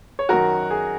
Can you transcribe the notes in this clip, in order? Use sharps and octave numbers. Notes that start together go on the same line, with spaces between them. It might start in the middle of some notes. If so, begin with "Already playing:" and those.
C#5
F#2 D#3 F#3 F#4 A#4
G#4